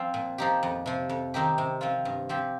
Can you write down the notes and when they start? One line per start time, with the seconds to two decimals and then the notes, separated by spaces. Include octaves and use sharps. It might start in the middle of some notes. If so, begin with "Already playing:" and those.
Already playing: F3 C4 F4
0.14 A#2
0.38 F3 D#4 G4
0.63 F2
0.86 C3 F3
1.09 F2
1.34 D#3 C4 D#4 G4
1.58 C3
1.81 F3 C4 F4
2.05 G2
2.29 F3 C4 G4